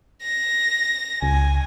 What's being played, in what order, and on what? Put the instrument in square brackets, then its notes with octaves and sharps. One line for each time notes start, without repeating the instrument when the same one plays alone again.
[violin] A#6
[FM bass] C#2 [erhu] G#5